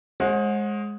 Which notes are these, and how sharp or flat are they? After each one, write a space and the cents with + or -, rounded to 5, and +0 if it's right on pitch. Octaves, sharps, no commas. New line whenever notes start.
G#3 +5 C5 +45 F#5 -25